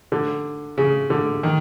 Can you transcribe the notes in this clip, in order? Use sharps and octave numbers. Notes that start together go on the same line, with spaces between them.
D3
C#3
D3
D#3